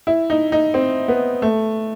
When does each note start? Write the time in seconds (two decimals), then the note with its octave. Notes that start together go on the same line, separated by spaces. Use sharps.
0.07 E4
0.30 D#4
0.52 D#4
0.74 C4
1.08 B3
1.42 A3